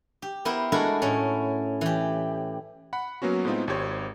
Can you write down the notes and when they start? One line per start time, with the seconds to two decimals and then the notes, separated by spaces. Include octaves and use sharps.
0.22 G4
0.45 B3 E4 A#4 C5
0.72 G#3 A3 D4 E4 F#4 A#4
1.02 A2 C#4
1.81 E3 G4
2.93 F#5 B5
3.22 F#3 A#3 B3 C#4 F#4
3.45 A2 G#3 B3 C4 D#4 F4
3.68 G#1 G4 C5 C#5 G#6